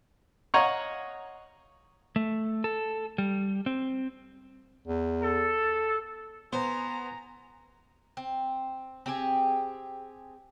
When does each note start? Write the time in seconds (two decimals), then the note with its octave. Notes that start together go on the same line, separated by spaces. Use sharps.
0.54 C#5 D#5 F5 F#5 A#5 C#6
2.16 A3
2.64 A4
3.18 G3
3.66 C4
4.87 E2
5.23 A4
6.53 B3 C5 G#5 A#5
8.17 C4
9.06 C4 G4 G#4